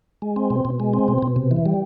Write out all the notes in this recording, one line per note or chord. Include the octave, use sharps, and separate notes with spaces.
G#3
C4
B2
B2
G#3
C4
B2
B2
C3
E3
G3